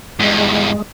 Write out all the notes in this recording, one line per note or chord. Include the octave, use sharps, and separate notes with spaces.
E2 G2 G#3